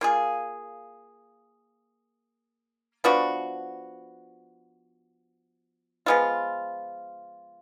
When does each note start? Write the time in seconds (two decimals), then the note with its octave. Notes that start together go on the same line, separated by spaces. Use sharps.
0.01 A#3 F4 G#4
3.04 F3 B3 D4 F#4
6.06 F3 G#3 B3 F4